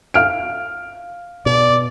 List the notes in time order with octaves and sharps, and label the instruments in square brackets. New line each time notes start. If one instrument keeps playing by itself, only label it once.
[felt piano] F5 F6 D7
[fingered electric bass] B2 [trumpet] D5